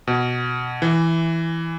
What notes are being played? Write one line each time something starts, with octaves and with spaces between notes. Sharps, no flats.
B2
E3